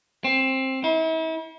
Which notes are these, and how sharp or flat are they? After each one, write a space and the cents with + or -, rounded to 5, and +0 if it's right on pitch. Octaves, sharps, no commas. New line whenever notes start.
C4 +15
E4 -40